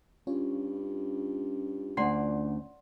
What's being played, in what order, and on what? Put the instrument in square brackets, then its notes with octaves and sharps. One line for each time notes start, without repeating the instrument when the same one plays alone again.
[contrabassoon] G2 [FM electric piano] C#4 F4 C#5
[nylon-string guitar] D2 D4 [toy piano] D5 F#5 C6